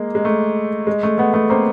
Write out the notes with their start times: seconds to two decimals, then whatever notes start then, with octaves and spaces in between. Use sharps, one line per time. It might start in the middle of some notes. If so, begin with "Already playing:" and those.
Already playing: G#3 A#3
0.15 G#3
0.25 A3
0.87 G#3
1.03 A3
1.18 A3 B3
1.34 A3 B3
1.49 A#3 C4